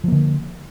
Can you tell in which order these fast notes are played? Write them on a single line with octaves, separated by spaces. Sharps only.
F3 A#3 D3